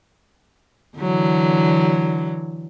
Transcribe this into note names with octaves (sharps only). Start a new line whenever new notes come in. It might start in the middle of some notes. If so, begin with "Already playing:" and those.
D3 E3 F#3